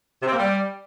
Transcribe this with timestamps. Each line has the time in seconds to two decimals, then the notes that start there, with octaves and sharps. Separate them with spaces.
0.22 C3
0.27 C4
0.32 A#3
0.38 G3